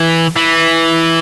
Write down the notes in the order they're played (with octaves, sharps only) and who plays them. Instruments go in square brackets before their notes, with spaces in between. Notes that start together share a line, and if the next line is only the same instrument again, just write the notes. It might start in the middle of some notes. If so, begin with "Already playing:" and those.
Already playing: [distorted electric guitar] E3
E3